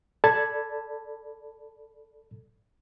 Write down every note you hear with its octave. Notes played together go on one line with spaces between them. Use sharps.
A4 D5 A5 B5 G#6